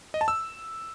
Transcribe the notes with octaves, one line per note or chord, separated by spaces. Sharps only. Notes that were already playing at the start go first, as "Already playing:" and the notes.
D#5
A5
E6